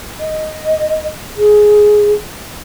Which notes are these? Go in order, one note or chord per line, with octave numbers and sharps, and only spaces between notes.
D#5
G#4